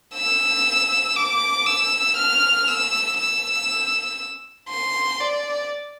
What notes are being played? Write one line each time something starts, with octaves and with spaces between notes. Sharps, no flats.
E6
D6
E6
F6
E6
E6
C6
D5